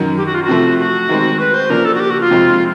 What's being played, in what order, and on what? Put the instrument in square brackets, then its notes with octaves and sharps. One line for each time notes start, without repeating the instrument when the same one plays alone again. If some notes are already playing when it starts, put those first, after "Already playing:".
Already playing: [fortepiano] F#2 D#3 F#3
[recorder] G4
F#4
F4
F#4
[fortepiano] C3 F3 A3
[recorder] F#4
[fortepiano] D#3 G#3 C4
[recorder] B4
C5
[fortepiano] C#3 F3 A#3 D4 [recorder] A#4
[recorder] A4
F#4
G4
F#4
F4
[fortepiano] F2 C3 F3 G#3 C4